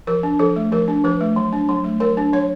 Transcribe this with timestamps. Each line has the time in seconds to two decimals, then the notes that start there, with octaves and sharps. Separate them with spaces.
0.07 F3 A#4
0.23 D4
0.39 F3 A4
0.56 A3
0.72 F3 A#4
0.88 D4
1.04 F3 B4
1.21 A3
1.36 F#3
1.53 D4
1.69 F#3
1.84 A3
2.00 F#3 A#4
2.17 D4
2.33 F#3 C#5